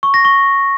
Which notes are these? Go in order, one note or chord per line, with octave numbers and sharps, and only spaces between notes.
C#6
A#6
C#6